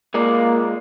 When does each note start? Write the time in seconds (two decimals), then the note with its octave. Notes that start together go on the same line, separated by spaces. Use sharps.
0.14 G#3 A#3 F4 D5